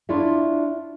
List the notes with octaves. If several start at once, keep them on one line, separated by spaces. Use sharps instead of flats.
D4 E4 F4 C#5 D5 E5